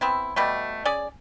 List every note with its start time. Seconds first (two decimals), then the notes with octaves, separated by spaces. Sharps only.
0.01 B3 C4 E4
0.36 B2 G3 A3
0.85 C#4 G#4 D5